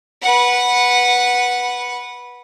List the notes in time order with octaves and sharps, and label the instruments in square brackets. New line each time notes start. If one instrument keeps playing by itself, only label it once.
[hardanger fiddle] B4 F#5